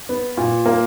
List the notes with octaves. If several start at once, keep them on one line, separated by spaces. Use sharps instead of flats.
B3
A#2
A#3